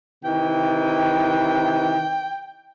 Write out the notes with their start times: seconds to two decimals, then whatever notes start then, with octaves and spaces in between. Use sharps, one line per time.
0.24 C3 D#3 E3 G5